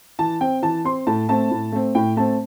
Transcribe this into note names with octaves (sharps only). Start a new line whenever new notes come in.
E3 A5
C4 G5
E3 A5
C4 C6
A2 A5
A3 C4 A5
A2
A3 C4
A2 G5
A3 C4 A5